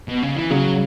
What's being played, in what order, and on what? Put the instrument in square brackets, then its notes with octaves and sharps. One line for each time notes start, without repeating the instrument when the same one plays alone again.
[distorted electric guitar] B2
C#3
E3
[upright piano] C#3 [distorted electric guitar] F#3